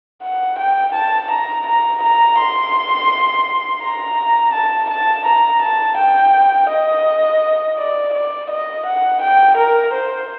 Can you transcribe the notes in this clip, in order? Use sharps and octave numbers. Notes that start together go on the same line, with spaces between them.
F#5
G5
A5
A#5
A#5
A#5
C6
A#5
A5
A5
A#5
A5
G5
D#5
D5
D5
D#5
F#5
G5
A#4
C5